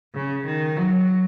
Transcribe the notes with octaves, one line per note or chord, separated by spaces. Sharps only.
C#3
D#3
F#3